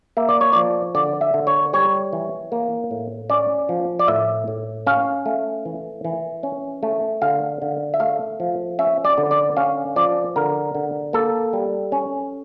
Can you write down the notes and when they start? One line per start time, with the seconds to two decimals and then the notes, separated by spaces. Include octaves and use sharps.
0.17 A#3 E5
0.29 D5
0.41 C#5
0.53 F3 D5
0.95 D3 D5
1.21 E5
1.34 D3
1.47 C#5
1.73 G3 C#5
2.13 E3
2.52 A#3
2.91 A2
3.30 C#4 D5
3.69 F3
3.99 D5
4.08 A2 E5
4.48 A2
4.87 C#4 F5
5.26 A3
5.65 E3
6.05 E3
6.43 C#4
6.83 A3
7.22 D3 F5
7.62 D3
7.94 E5
8.00 A3 F5
8.40 F3
8.79 C#4 E5
9.05 D5
9.18 D3
9.31 D5
9.57 C#4 F5
9.96 F3 D5
10.36 D3 A#4
10.75 D3
11.13 A#3 A4
11.53 G3
11.92 C#4